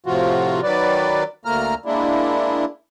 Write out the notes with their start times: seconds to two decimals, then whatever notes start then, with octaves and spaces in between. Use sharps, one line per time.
0.06 A2 C3 F3 F4 F#4
0.63 D#3 F#3 B4 D5
1.45 D2 A3 A#3 A#5 F6
1.85 G#3 A#3 D4 E4